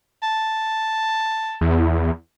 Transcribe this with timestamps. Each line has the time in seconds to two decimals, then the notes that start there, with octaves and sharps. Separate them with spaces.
0.23 A5
1.61 E2